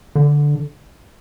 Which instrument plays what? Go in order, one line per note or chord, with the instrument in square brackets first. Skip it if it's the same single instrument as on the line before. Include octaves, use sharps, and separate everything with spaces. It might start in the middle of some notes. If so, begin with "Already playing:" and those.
[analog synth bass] D3